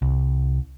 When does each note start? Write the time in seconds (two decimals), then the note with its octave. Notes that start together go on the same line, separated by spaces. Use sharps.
0.02 C2